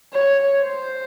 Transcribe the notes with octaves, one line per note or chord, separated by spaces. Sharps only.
C#5
C5